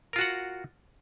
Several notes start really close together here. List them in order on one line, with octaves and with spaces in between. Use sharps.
A#4 F4 F#4 F#5